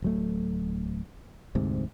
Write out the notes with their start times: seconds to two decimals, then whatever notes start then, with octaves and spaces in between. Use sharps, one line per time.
0.02 D1 F#3 A3
1.55 F1 D2 G#2 C3